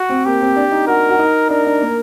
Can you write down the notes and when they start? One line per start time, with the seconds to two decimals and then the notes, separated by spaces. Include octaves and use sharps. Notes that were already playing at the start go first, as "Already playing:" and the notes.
Already playing: F#4
0.09 C4
0.25 A#3 G4
0.41 C4
0.56 D4
0.72 D#4
0.87 F#4 A#4
1.09 F#4
1.19 D#4
1.49 D4 A#4
1.65 D4
1.81 A#3